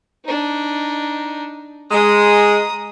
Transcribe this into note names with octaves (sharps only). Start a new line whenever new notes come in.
D4 D#4
G#3 A#5 D#6